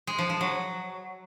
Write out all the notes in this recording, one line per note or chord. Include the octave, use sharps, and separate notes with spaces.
G#3
F3
F3
F#3